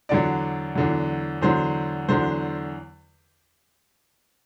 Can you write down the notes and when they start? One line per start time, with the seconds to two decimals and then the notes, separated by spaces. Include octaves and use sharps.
0.09 E2 D3 F#3 D5
0.75 E2 D3 F#3
1.42 E2 D3 F#3 C5
2.08 E2 D3 F#3 C5